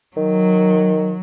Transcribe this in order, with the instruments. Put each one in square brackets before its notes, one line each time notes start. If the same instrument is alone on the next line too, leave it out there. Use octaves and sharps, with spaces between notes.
[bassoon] D#3 [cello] F#3